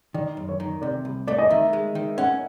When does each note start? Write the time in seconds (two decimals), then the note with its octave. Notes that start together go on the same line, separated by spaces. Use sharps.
0.14 D#3 D5
0.37 F#2
0.49 C#5
0.60 D#3
0.82 C3 D5
1.05 C2
1.27 A3 D5
1.38 D#5
1.50 D#3 E5
1.73 G#3
1.95 D#3
2.18 C#4 F#5